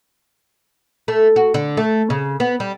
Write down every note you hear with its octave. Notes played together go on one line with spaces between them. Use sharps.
A3
F#4
D3
A3
C#3
B3
G3